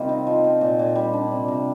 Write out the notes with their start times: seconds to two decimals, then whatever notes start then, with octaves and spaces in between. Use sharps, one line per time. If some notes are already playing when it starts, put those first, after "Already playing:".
Already playing: C3 D#3 G3 A#3 C4 F4
0.09 D#4
0.27 F3
0.44 C4
0.61 A#2
0.79 A#2
0.95 G3
1.13 D4
1.31 C3
1.48 C3